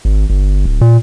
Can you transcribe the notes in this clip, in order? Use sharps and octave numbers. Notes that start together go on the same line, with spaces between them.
G#1
G1
D1
A#2